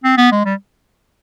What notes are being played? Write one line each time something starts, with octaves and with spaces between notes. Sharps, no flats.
C4
B3
G#3
G3